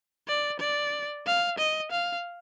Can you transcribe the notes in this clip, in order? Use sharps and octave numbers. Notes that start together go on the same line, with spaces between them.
D5
D5
F5
D#5
F5